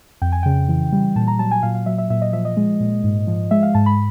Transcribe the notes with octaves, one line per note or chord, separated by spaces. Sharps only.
F2 G5
G#5
C#3 G5
E3
G3
A#2 A5
A#5
F#3 A5
G#5
A#2 F5
F5
F#3 E5
E5
A#2 E5
D#5
F3 E5
D#5
G#3
A#2
G#2
F3
G#3 E5
F5
G#2 A5
B5